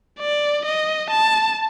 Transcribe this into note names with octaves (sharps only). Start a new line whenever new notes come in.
D5
D#5
A5